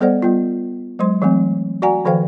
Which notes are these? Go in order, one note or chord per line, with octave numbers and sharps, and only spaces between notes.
G3 B3 A4 C5 D5 F#5
G3 B3 F4
F#3 G#3 C5 C6
E3 F#3 A3 C4
F#4 D5 F#5 G#5 A#5
D#3 F3 A4 C5 F5 G5